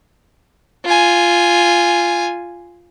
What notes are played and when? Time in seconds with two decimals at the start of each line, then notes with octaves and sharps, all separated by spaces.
0.85 F4 G#5